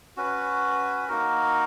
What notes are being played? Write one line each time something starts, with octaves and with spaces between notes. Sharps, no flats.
C#4 F#4 B4
A#3 D#4 F#4 A#4